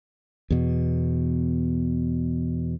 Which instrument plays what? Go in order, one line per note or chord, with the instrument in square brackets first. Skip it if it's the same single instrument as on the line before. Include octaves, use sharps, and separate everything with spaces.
[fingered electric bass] E2 B2